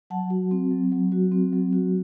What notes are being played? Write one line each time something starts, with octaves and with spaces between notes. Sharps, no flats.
F#3 F#5 A5
F#4
C4
F#3
F#3
F#4
C4
F#3
F#4